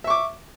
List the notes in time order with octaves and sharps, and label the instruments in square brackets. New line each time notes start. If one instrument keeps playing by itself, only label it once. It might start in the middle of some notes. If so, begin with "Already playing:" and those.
[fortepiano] E5
C#6
D6